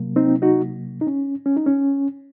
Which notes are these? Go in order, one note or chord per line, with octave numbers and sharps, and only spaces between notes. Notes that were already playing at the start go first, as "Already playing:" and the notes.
Already playing: C3 F#3 A#3
C4 D#4
D#4 F#4
D#4
C#4
C#4
D#4
C#4